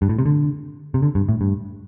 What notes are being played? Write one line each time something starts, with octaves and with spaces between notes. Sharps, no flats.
G2
A2
C3
D3
C3
D3
G2
A2
G2